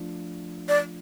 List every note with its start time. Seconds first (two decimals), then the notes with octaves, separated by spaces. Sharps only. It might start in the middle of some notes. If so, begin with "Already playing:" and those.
Already playing: F3 A3 D4 F4
0.68 D5